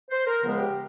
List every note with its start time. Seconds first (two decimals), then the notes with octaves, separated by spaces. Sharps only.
0.10 C5
0.26 A#4
0.41 C#2 C#3 F3 G#3 B3
0.58 G4